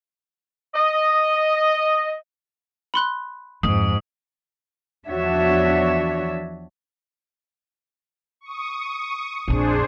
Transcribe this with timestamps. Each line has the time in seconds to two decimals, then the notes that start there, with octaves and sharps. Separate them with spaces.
0.75 D#5
2.94 B5 C6 F#6
3.63 F2 G#2 D#6
5.08 E2 F3 D4 F#4 C#5 E5
8.41 C#6 D#6
9.48 A#1 F2 D4 G#4 C5